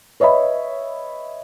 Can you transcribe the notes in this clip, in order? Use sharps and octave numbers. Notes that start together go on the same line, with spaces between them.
B4 C#5 D#5 E5 B5